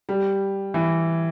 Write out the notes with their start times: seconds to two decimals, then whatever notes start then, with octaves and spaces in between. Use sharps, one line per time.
0.09 G3
0.74 E3